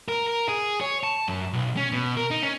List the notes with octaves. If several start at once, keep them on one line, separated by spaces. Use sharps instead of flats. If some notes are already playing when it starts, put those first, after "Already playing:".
A#4
A#4
G#4
C#5
A5
F#2
B1
C#4
B2
A#4
D#4
C#4